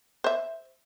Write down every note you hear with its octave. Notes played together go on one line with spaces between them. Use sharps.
C5 E5